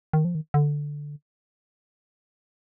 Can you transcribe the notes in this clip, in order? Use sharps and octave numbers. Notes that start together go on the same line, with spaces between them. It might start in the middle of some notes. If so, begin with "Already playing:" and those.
D#3
F3
D#3
D3